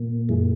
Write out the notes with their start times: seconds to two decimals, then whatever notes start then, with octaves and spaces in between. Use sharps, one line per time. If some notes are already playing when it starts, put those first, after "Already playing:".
Already playing: A#2
0.29 F#2 E3 G#3